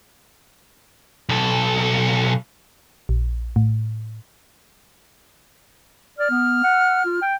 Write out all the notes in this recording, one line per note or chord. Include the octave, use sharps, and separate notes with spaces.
B1 A4
A#1
A2
D5 F6
B3
F#5
F4
G5